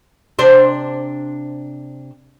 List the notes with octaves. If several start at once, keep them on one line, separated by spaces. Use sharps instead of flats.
C3 D4 C5